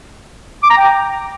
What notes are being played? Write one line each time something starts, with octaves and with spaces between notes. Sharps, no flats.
D6
A#5
G5